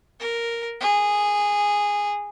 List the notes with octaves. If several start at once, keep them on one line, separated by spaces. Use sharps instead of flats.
A#4
G#4